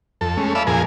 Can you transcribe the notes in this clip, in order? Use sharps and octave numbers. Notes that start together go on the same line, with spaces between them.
F2 A4
G#3 A3 C#4
A4 D5 E5 F5 B5
F2 A#2 F3 G#4 A#4 G#5